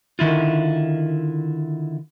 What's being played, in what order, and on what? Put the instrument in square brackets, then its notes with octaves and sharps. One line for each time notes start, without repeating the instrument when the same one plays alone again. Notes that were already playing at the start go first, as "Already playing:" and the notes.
[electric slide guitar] D3 D#3 E4 F4